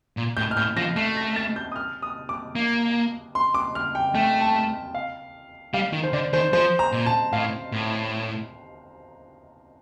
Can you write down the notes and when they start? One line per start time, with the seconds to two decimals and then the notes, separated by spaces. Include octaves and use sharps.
0.17 A#2
0.37 A2 G6
0.51 F6
0.57 A2 G6
0.77 F3 A#6
0.96 A3 C7
1.17 A#6
1.36 A6
1.56 G6
1.72 D#6
1.76 F6
2.02 D#6
2.29 D6
2.55 A#3
3.35 C6
3.54 D6
3.75 F6
3.95 G5
4.15 A3 G5
4.41 A5
4.95 F5
5.74 G3 F5
5.93 D#3
6.03 C5
6.13 D3 D5
6.33 D#3 C5
6.53 F3 C5
6.79 A#5
6.92 A#2
7.06 A5
7.33 A2 F5
7.72 A2